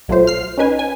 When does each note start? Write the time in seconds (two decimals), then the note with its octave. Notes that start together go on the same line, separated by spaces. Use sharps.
0.08 B1 F#3 A3 F4 C5
0.27 F6 C7
0.58 C#4 D#4 B4 G#5
0.79 G#5